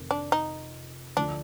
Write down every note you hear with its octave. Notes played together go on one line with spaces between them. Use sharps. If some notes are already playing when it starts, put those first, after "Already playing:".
Already playing: F1 F2 D#3
D4
D#4
D2 D3 F3 D4